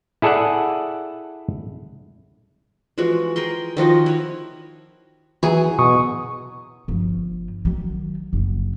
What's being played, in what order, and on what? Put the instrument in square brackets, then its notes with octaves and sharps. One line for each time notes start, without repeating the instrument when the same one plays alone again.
[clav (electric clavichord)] E4 G#4 A4 D5 E5 F#5
[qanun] E3 F3 G#3 F#4
G#4 A#4 G5 C6
D#3 F3 F#4 D#5
E4 B4 C#5
[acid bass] E3 [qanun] F#3 G#4
[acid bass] B2 [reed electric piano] C#6 D#6
[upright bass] G1 F3
D#3 F#3
F#1 F#3